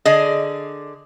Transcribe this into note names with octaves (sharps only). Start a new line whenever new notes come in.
D3 G#4 D5 D#5